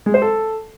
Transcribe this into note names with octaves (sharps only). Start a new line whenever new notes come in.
G#3
C5
A4